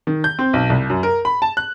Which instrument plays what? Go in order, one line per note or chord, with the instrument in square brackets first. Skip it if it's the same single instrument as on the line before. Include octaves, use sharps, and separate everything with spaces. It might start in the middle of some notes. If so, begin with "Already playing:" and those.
[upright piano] D#3
G6
C4
B1
C2
F#2
A#4
B5
A5
F#6